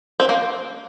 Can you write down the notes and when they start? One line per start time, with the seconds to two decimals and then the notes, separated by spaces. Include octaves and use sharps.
0.20 C4
0.29 A#3